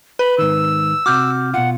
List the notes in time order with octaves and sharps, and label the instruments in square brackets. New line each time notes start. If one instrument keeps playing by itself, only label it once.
[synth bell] B4 [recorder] B5
[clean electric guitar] G#2 D#3 [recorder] E6
[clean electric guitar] C3 F#4 [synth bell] D6 F6 G6
[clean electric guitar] B2 F4 [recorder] F#5